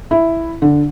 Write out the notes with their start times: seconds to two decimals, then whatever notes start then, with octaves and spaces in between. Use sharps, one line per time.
0.11 E4
0.62 D3